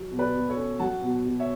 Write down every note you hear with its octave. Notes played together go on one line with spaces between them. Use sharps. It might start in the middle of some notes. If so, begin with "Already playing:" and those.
Already playing: F#3
B2
B4 D5
B2
A4 C#5
C#4
F#3 F#5 A5
B2
B2
C#5 E5